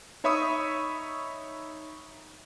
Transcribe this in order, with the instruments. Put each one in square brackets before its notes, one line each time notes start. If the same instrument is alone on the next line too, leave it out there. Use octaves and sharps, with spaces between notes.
[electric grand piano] D#4 C#5 E5 B5 C#6 D#6